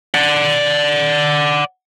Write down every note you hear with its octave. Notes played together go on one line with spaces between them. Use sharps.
D5 F#5